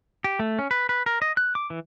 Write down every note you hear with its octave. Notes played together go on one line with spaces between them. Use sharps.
G4
A3
C#4
B4
B4
A#4
D#5
F#6
D6
E3